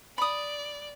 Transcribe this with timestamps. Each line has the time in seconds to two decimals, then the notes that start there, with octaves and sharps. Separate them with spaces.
0.18 D5 B5 D#6